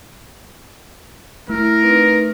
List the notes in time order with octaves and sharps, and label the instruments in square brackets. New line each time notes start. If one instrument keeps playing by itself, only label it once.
[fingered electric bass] A3 [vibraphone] E4 [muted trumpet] A#4
[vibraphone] C4 D#4 B4